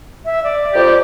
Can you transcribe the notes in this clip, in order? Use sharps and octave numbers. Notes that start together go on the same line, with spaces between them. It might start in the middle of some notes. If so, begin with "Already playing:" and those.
E5
D5
F2 G4